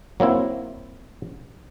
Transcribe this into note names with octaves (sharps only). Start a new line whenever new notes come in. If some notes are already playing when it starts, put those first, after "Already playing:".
F#3 A#3 C4 E4